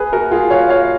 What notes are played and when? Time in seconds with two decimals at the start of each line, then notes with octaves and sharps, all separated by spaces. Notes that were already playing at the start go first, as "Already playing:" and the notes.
Already playing: G#4 B4
0.13 F#4 A#4
0.31 F4 G#4
0.50 C#5 F5
0.70 C#5 F5